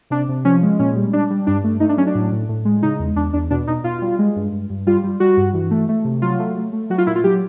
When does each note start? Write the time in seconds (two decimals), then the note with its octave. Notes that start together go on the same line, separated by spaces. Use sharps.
0.10 C3 D4
0.28 C3
0.45 F3 C#4
0.63 G#3
0.79 A#2 C#4
0.96 G3
1.13 G3 D4
1.30 G3
1.47 G2 D4
1.64 A3
1.80 A3 D#4
1.89 D4
1.97 F#3 C#4
2.07 D4
2.15 A2
2.32 A2
2.49 A2
2.65 G#3
2.83 C#3 D#4
2.99 E2
3.16 E2 D4
3.33 E2 D4
3.50 B2 D4
3.67 B2 D#4
3.84 B2 F4
4.01 G3
4.19 G#3
4.36 G2
4.52 G2
4.70 G2
4.87 G3 F4
5.04 G3
5.20 G3 F#4
5.37 G2
5.54 E3
5.71 A3
5.89 A3
6.04 C3
6.22 F#3 F4
6.39 A3
6.57 A3
6.73 A3
6.90 F#3 F#4
6.98 F4
7.07 A#2 E4
7.16 F4
7.24 F#3 G4